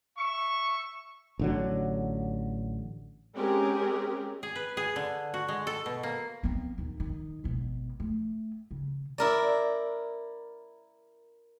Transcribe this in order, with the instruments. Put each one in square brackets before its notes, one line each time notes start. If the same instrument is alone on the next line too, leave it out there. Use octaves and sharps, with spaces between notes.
[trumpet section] E5 C#6
[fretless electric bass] A1 D3 F#3
[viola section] G#3 C4 C#4 G4 G#4 A#4
[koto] G#4
B4
G#4
D3
F#4
G#3
A4
B2
A#3
[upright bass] B3 C4
D#2 A#2
D#3
G#1 B2
A3
C#3
[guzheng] E4 A#4 D5